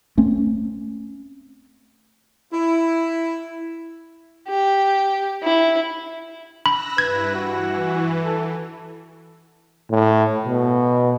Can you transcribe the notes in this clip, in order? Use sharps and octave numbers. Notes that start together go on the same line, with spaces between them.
A3 C4 C#4
E4
G4
E4
B5 E6 F#6 A#6
G2 E4 B4 G#6
E3 F#4
A4
A2
B2